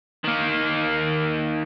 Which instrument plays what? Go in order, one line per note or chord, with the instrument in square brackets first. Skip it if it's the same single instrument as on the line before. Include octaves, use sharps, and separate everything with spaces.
[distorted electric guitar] D#3 A#3